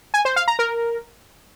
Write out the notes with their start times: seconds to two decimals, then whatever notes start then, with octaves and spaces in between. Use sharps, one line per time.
0.14 G#5
0.25 C5
0.36 F5
0.48 A#5
0.59 A#4